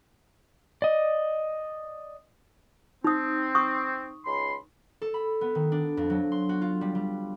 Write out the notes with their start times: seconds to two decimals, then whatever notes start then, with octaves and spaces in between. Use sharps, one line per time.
0.82 D5 D#5
3.04 C4 D#4 D#6
3.55 C#6 D#6
4.25 C#2 B5 C6
5.02 A4
5.14 B5
5.41 B3
5.55 D#3
5.72 D4
5.97 F2
6.10 F#3
6.32 C6
6.49 F#4
6.61 F4
6.81 G3
6.95 G3